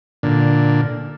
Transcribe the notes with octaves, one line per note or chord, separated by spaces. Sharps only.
A#2 D3